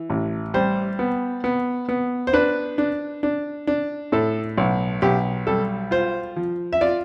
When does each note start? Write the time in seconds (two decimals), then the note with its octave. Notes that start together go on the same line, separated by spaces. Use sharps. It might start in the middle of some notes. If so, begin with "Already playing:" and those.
Already playing: E3
0.10 A1
0.54 G3 C5
0.99 B3
1.44 B3
1.89 B3
2.27 C5
2.33 D4 B4
2.78 D4
3.23 D4
3.67 D4
4.12 A2 A4
4.57 B1
5.02 B1 G4
5.47 G3 A4
5.91 F4 C5
6.36 F3
6.73 E5
6.81 F4 D5